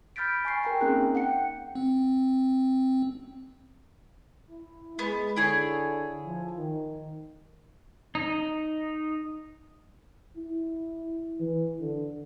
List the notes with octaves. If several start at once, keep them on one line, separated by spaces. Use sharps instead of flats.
B5 F6 G6 A6 B6 D7
G#5 C#6 C7
A#4 G5 A#5
A#3 C4 C#4 D#4 G#4 F#6
F#5 G5 C#7
C4
E4
G#3 B3
D3 E4 G#4 C#5
F3
D#3
D#4
E4
E3
D3